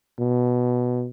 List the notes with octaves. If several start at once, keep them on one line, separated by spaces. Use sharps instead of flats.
B2